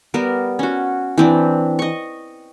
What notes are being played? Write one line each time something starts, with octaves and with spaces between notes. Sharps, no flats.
G3 B3 A#4
C#4 F#4
E3 C4 D4
D#5 C#6